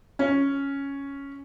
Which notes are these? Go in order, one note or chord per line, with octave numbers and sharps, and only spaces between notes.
C#4